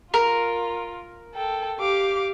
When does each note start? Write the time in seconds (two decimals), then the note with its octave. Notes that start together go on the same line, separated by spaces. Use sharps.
0.14 F4 A#4
1.33 A4 G5
1.78 G4 F5 D6